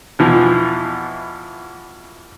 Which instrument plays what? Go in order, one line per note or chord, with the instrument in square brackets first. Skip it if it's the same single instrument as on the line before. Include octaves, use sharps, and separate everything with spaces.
[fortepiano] E2 B2 E3 F3